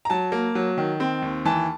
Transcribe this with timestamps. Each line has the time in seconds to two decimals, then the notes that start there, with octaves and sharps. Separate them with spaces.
0.05 A#5
0.10 F#3 A5
0.32 A#3
0.55 F#3
0.78 D#3
1.00 C4
1.22 D#2
1.45 E3 A5